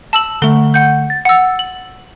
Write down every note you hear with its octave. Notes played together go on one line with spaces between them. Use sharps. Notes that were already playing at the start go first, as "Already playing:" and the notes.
A5 E6 F#7
D3 A3 G7
F#5 G6
A6
F#5 E6
F#7